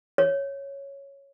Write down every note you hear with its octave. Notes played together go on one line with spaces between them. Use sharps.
C#5